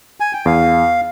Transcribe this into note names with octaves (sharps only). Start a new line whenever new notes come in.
G#5
G5
E2 F5